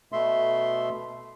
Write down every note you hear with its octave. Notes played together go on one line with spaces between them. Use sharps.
B2 A3 E5 C6